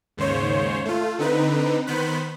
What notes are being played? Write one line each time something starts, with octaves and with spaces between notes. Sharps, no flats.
D#2 G#2 C#3 C5 C#5
A3 F4
D3 C4 D#4 B4
D#3 B3 C5 B5 F#6